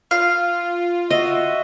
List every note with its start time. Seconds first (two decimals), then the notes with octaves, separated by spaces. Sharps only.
0.11 F4 F5
1.10 F#4 D#5 E5